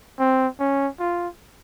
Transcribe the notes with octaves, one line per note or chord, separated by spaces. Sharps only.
C4
C#4
F4